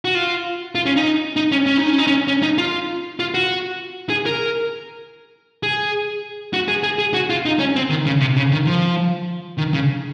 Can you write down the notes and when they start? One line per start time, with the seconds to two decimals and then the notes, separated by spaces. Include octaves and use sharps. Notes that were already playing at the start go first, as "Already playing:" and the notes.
0.05 F#4
0.15 F4
0.75 F4
0.86 C#4
0.97 D#4
1.36 D#4
1.52 C#4
1.66 C#4
1.77 D#4
1.88 C#4
1.98 D#4
2.07 C#4
2.28 C#4
2.43 D#4
2.58 F4
3.20 F4
3.34 F#4
4.10 G#4
4.26 A#4
5.63 G#4
6.53 F#4
6.68 G#4
6.83 G#4
6.99 G#4
7.14 F#4
7.30 F4
7.45 D#4
7.59 C#4
7.76 C4
7.90 D#3
8.06 C#3
8.20 C3
8.37 C#3
8.52 D#3
8.66 F3
9.58 D#3
9.73 C#3